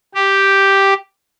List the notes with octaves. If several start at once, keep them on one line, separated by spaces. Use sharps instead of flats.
G4